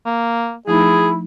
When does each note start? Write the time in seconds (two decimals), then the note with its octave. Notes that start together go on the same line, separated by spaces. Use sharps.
0.06 A#3
0.68 F3 A3 D#4 E4 G#4